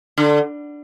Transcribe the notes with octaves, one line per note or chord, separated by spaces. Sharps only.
D3